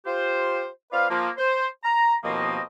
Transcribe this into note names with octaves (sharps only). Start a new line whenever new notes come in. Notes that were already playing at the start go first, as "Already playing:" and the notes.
F4 G4 C5
C4 F4 B4 D5 F5
F3 A#3
C5
A#5
D#2 B2 F3 A#3 C4 D#5